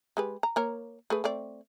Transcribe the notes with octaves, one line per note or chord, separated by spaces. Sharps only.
G#3 G4 B4
A#5
A#3 A#4 C#5
A3 G#4 B4
A3 C4 D5